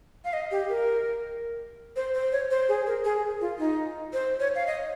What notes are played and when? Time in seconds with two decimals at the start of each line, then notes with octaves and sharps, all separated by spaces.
0.25 F5
0.33 D#5
0.51 G4
0.69 A#4
1.96 C5
2.14 C5
2.32 C#5
2.51 C5
2.68 G#4
2.87 A#4
3.04 G#4
3.41 F4
3.59 D#4
4.13 C5
4.40 C#5
4.55 F5
4.67 D#5